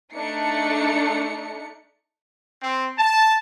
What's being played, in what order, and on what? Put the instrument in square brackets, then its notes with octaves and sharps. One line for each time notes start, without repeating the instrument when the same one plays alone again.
[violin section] A3 D4 D#4 C#7
[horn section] C4
A5